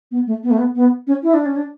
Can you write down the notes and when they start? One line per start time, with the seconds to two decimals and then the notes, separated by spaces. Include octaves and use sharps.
0.11 B3
0.27 A3
0.43 B3
0.51 A3
0.58 B3
0.75 B3
1.07 C#4
1.23 E4
1.34 D4
1.46 C#4
1.56 D4